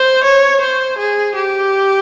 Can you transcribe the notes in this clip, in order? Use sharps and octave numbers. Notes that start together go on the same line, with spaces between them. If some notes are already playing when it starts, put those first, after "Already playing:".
Already playing: C5
C#5
C5
G#4
G4